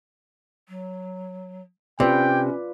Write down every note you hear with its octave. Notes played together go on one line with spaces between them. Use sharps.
F#3
C3 C#4 F4 B4 D5 G5